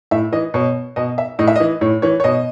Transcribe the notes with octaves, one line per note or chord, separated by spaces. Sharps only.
A2 E5
E3 D#5
B2 C#5
B2 D#5
E5
A2 D#5
E5
D#5
E3
A2 C#5
E3 C#5
C#5
B2 D#5